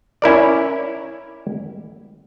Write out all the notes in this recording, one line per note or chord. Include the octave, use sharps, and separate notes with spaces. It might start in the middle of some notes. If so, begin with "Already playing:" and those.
C#4 E4 A#4 D5